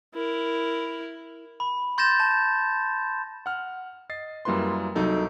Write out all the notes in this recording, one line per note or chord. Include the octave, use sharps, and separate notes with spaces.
E4 A#4
B5
C6 G6 A6 A#6 E7
A5
F#5 F6
D#5 A6 C7
F#2 G3 A#3 E4 B4 C6
C2 F#3 D#4 A4